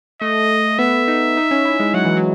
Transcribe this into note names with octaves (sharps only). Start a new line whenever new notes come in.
A3 D#5
B3 E5
D#4
D#4
C#4
E4
G#3
F#3 F#5
E3
F#3